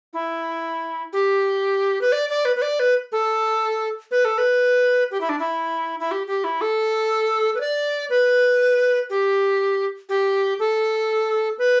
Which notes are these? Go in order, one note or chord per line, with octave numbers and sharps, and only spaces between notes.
E4
G4
B4
D5
D5
B4
B4
D5
B4
A4
B4
A4
B4
G4
E4
D4
E4
E4
G4
G4
E4
A4
B4
D5
B4
G4
G4
A4
B4